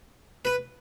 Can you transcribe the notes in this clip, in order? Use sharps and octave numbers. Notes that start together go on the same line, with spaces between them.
B4